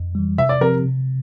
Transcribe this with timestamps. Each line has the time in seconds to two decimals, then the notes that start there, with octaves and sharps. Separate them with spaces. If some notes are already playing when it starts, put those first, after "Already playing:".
Already playing: F2
0.15 E3 G3
0.38 C3 E5
0.49 D5
0.61 F3 C4 G4 A#4
0.84 C3